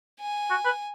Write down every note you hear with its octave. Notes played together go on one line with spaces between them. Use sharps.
G#5
F#4
B4